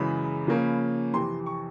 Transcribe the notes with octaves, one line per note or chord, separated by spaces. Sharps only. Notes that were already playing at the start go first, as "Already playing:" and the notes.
Already playing: F#2 C#3 E3 G#3 B5
C#3 F3 A#3 C#4
F2 C3 E3 C6
C#6